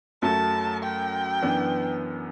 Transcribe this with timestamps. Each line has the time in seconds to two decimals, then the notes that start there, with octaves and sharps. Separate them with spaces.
0.22 F#2 F#3 A3 A5
0.83 G5
1.42 F#2 E3 B3 D4